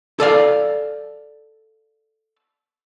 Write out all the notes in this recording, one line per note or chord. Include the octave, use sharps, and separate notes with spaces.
A4 D5 F5